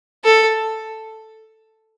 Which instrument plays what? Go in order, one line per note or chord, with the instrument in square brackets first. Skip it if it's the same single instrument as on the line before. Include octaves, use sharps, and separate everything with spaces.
[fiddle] A4